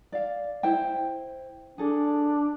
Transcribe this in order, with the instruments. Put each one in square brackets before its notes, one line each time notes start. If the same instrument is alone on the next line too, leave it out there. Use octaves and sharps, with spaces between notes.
[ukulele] D5 F5
E4 C5 G5
[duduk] D4 [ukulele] G#4 A4